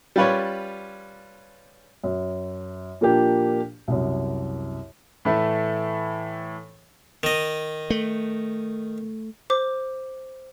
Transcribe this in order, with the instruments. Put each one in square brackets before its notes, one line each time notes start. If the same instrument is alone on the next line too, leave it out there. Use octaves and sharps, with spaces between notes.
[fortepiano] G3 C#4 F4 B4 C#5 D5
[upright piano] F#2
A#2 F3 A#3 D4 G4
C2 F#2
[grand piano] A2 E3 A3 E4
[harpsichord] D#3 D#5
[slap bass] A3
[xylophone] C5 D6